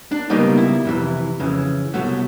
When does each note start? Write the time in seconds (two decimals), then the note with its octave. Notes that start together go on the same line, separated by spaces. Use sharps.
0.11 D4
0.30 C#2 B2 G3 A#3 D#4
0.57 E4
0.85 F2 C3 E3
1.39 F2 C#3 E3
1.94 C2 B2 F#3 A3 F#4